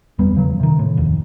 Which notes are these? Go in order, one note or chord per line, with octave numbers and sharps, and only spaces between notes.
F#1 E2 G3 B3
E2 C#3 F#3
C3 D#3
A2
F1 D#2